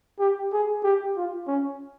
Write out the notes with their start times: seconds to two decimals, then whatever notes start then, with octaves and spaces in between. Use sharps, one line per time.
0.20 G4
0.52 G#4
0.83 G4
1.17 F4
1.47 C#4